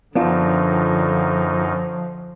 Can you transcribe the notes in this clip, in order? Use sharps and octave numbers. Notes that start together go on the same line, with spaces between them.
F#2 D3 F3 B3 D4 D#4 F4